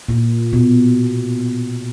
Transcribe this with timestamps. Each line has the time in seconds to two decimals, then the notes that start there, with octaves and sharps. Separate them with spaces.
0.09 A#2
0.53 B2